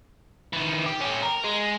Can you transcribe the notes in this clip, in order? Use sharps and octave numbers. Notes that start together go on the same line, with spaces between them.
D#3 E3
G4
C#4 G4
A#4
G#3